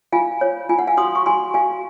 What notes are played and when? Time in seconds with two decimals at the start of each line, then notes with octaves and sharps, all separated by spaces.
0.12 F4 F5 G#5
0.41 C#5
0.69 F4 G#5
0.79 F#5
0.87 F5 G#5
0.97 F#4 C6 D#6
1.15 C#6
1.26 F#4 G#5 C6
1.54 F#4 F5 G#5